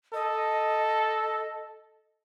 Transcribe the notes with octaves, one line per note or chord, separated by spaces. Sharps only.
A4 D#5